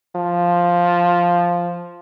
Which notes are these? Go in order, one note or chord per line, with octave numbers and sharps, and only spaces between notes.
F3